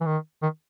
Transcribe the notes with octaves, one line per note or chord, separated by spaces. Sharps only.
E3
D#3
D#3